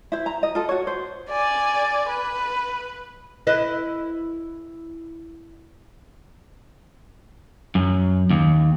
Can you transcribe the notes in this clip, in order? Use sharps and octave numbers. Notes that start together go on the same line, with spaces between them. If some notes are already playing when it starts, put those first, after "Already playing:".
E4 C5
A#5
D#5
F4 A4
F#4 C#5
C5
D5 G#5
B4
E4 B4 D#5
F#2
D#2